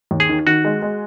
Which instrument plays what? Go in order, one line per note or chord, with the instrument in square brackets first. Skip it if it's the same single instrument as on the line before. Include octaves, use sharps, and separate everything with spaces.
[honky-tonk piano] D#2
[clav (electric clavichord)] G#4
[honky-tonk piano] D#3
[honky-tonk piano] D#3 [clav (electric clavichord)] F#4
[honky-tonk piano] G#3
G#3